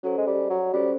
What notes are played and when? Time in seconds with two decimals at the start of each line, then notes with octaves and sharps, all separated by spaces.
0.03 F#3 C#4 F#4 A4 C5
0.18 G#3
0.27 G3
0.50 F#3
0.73 G3 C#4 F#4 A4 C5